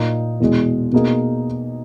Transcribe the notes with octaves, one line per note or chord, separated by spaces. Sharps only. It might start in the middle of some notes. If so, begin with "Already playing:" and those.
Already playing: A#2 A#3 D#4
E2 B2 G#3
B2 A#3 D#4 G#4